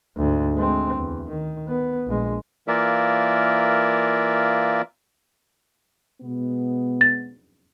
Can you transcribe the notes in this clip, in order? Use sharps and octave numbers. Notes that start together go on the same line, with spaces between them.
D2 G#2
G#3 C4
E2
D#3
B3
A#1 G#3
E3 A#3 F4 A#4 D5 E5
B2 G#3 B3
A6